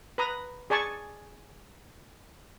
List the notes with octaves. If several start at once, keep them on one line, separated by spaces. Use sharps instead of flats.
B4 A#5 D#6
G#4 D5 G#5 A5 C#6